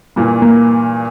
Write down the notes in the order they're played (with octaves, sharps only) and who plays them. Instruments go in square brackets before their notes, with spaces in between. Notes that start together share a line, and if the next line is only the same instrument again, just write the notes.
[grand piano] G2 A#2 E3
[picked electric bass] A#3